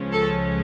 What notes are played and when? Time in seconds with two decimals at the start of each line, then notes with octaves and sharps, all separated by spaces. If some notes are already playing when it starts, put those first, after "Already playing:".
Already playing: C#2 C#3 F3 G#3 C#4
0.12 A4